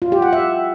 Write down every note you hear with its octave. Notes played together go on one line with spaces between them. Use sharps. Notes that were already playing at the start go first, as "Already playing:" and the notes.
F4
G4
F#5
E5